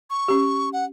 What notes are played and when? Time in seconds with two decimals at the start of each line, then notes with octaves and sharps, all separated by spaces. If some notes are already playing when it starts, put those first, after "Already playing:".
0.10 C#6
0.28 C#4 G4
0.73 F#5